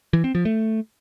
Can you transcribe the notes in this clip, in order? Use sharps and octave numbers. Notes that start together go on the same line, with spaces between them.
E3
C4
F3
A3